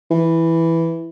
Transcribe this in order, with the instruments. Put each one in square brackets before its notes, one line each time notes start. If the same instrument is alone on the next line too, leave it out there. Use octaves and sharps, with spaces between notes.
[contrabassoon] E3